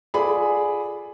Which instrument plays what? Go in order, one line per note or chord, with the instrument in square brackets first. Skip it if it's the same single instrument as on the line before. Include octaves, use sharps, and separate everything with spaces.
[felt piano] F4 G#4 A4 D5 B5